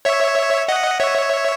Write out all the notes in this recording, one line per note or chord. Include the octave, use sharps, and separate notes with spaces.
C#5 E5
D#5 F#5
C#5 E5